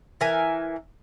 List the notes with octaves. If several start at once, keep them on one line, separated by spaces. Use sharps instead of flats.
E3 A#4 E5 G#5